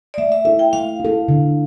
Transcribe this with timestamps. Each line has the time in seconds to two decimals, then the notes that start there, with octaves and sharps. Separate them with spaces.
0.14 D5
0.18 A3 E5
0.32 E5
0.45 E4 A4 E5
0.59 G5
0.73 A3 F5
1.00 E4 A4
1.28 D3